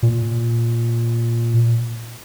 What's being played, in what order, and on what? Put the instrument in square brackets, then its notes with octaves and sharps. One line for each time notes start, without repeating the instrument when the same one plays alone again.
[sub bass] A#2